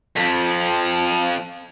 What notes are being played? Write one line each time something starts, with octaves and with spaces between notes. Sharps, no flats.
F2 F3